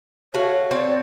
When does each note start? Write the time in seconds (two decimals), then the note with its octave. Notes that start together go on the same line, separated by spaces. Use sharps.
0.34 A3 F#4 C#5 F5
0.71 C4 C#5 D5